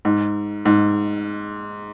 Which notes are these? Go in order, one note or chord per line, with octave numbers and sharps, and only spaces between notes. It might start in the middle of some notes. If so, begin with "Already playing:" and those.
G#2
G#2